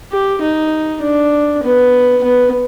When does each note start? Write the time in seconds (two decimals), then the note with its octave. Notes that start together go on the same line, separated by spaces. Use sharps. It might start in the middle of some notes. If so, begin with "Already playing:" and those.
0.12 G4
0.42 D#4
1.02 D4
1.63 B3
2.23 B3